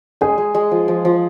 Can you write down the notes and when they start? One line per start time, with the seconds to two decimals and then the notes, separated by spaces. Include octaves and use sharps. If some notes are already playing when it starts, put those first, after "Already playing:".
0.21 G#3 G#4
0.38 G#3
0.55 G#3
0.71 F3
0.88 F3
1.05 F3